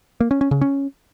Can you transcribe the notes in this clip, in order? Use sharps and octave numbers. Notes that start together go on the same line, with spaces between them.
A#3
C#4
C#4
C#3
C#4